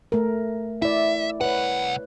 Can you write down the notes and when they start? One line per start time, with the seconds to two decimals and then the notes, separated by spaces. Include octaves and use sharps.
0.12 A3 A#4
0.82 E4 D5 E5
1.41 C2 B4 C#5 F#5